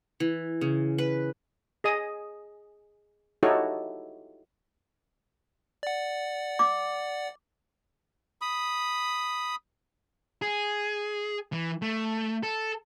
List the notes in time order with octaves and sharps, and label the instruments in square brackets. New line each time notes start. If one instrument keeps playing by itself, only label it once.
[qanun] E3
C#3
B4
[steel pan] G#4 D#5 D#6
D#4 E4 F#4 G4 A4 C#5
[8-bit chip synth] D5 F#5
[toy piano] D6
[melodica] B5 D#6
[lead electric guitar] G#4
E3
A3
A4